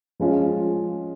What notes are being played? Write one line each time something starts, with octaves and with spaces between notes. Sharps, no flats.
F3 G#3 C#4 F4